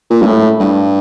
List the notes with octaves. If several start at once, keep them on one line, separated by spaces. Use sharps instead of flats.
A#2
G2
A2
G2